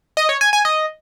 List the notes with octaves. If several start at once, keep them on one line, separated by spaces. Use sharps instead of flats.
D#5
C#5
G#5
G#5
D#5